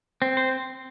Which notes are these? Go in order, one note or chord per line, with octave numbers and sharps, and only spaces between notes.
C4
C5